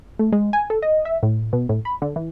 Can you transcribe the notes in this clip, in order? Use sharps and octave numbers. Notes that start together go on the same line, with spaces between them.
A3
G#3
G#5
A4
D#5
E5
A2
B2
A2
B5
D3
E3